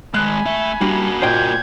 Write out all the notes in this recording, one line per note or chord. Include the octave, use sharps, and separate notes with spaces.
D#3 G#3 G#5 B5 F#6
A3 E5
G3 A#3 D4 F#4
A#2 C5 D#5 G5 G6 G#6